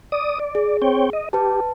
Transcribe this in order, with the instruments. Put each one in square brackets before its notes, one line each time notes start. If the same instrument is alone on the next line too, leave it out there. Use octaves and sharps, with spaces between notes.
[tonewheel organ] D5 D#6
D5
[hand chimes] G#4
[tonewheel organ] C4 C#5 G5
D#5
[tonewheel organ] G4 [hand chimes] B4 A5